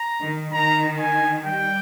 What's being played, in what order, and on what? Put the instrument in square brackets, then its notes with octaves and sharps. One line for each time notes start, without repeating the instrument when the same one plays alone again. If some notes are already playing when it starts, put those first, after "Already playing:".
Already playing: [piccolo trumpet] A#5
[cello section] D#3
[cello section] D#3 [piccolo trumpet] A#5
[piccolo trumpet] G#5
[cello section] G3 [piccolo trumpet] G5